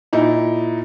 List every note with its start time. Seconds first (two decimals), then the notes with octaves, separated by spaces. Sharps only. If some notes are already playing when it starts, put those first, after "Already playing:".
0.13 A#2 D#4 E4